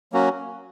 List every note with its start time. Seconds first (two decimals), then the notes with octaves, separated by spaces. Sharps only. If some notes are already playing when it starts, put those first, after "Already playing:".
0.12 F#3 A#3 C#4 F#4